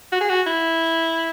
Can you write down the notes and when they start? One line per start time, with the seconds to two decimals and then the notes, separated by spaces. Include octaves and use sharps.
0.12 F#4
0.21 G#4
0.29 F#4
0.46 E4